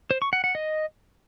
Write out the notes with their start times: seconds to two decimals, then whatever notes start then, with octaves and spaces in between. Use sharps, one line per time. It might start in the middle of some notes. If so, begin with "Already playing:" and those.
0.11 C5
0.22 C#6
0.33 F#5
0.44 F#5
0.55 D#5